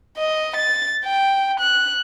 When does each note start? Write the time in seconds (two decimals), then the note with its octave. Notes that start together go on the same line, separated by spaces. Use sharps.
0.17 D#5
0.56 A6
1.05 G5
1.60 F#6